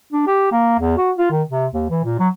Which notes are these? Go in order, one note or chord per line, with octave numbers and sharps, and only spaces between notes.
D4
G4
A#3
E2
F#4
F4
D#3
C3
D#2
E3
A#2
F#3